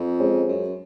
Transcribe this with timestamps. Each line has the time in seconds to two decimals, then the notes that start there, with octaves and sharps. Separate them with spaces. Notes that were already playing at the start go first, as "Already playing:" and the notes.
Already playing: F2
0.19 G#3 C#4 G#4 C5
0.48 F#2